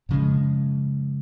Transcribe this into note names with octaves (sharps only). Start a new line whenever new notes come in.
F#2 C#3 F3 G#3